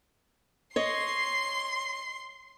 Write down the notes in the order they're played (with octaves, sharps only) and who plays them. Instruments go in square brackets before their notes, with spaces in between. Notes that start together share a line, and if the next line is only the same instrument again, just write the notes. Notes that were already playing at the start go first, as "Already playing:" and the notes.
[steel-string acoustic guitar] C#5 D#5 [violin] C6 C7